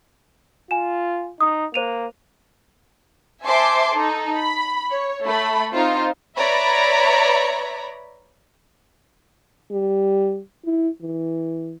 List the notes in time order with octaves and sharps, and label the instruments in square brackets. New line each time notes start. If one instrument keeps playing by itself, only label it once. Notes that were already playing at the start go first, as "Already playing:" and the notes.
[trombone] F4 [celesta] G#5 E7
[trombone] D#4 [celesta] D#6
[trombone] A#3 [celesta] C5 D#7 F7
[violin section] C5 E5 G#5 A5 C6 D6
D#4 A4
B5
C#5
A3 B5
C4 D#4 F4 C5 F5
B4 C#5 D5 E5 A#5 B5
[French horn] G3
E4
E3